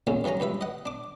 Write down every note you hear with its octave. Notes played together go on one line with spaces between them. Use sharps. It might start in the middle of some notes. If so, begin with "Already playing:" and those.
E2 A#2 C#3 G#3 C#4
G2 E3 F#3 C#4 A#5
C#2 G2 B4 E5
D#5 F#5
D4 D6